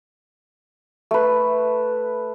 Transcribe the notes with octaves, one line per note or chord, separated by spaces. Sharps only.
A3 B4